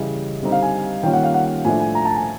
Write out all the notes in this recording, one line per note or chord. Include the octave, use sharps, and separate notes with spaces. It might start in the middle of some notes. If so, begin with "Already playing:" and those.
Already playing: C#3 E3 G3 D#5
D3 G3 C4 D#4
F5
G#5
D#3 G3 A#3 C#4 F4 G5
F#5
F5
F#5
A2 F3 A3 D4 G#5
G#5
A#5
A5
G#5